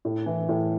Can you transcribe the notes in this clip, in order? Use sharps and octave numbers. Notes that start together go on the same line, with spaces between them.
A2
E3
A2